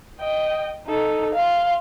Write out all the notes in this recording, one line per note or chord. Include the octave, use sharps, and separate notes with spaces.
D#5 G5
D#4 A4
F5 C6